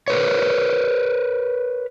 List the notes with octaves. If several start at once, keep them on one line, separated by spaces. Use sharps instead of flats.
A#4 B4 C#5